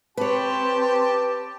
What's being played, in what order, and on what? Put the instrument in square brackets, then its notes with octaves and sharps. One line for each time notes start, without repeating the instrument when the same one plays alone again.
[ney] C4 [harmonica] G4 G5 A5 [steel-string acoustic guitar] B4 C#5